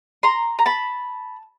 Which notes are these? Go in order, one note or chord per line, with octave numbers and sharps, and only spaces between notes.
A#5 C6
A#5
A5 B5